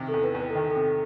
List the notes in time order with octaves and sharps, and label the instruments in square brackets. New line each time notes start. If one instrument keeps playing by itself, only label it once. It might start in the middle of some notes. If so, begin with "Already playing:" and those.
Already playing: [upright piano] C3 D#3
[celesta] A4
[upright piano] E2
[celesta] B4
[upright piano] E2
[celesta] B4
A4
[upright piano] D#3
[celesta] A4
[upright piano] C3